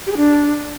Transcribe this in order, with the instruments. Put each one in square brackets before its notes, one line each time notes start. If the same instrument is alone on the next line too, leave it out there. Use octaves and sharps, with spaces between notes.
[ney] G4
G#4
D4